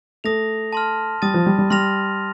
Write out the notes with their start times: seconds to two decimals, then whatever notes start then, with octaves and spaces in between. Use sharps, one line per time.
0.24 A3 D#6 A#6 F7
0.73 A5 C6 F6
1.22 G3 D#6 A6 D#7
1.34 F3
1.46 G3
1.59 G3
1.70 G3 C6 F6 A#6 F7